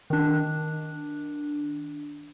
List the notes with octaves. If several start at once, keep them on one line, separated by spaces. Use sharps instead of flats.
D#3 D4